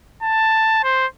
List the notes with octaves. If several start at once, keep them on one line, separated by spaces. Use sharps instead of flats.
A5
C5